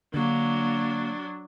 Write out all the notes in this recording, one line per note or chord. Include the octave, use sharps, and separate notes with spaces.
D3 F#3 A#3 D4